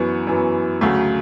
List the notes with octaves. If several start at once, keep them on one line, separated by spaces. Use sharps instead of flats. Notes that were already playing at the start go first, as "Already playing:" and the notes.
Already playing: F#2 E3 B3 C#6
F#2 E3 B3
D2 C#3 F#3 A3